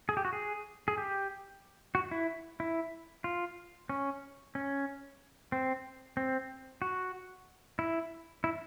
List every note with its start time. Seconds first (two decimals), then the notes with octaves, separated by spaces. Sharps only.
0.09 G#4
0.17 G4
0.25 F#4
0.33 G#4
0.88 G#4
0.98 G4
1.95 F#4
2.11 E4
2.60 E4
3.24 F4
3.89 C#4
4.55 C#4
5.52 C4
6.17 C4
6.82 F#4
7.79 E4
8.44 E4